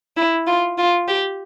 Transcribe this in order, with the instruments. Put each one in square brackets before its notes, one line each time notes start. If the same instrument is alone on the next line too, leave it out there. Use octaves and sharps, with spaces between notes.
[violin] E4
F4
F4
G4